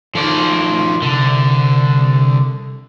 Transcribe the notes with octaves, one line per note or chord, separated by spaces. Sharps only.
D#3 F3 A3 D5
C2 D3